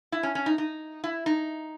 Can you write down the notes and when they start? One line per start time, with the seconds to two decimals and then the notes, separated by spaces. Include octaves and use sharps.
0.12 E4
0.23 C#4
0.35 C#4
0.46 D#4
0.58 D#4
1.04 E4
1.26 D#4